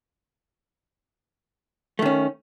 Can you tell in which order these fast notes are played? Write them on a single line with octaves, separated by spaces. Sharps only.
A3 D#3 C#4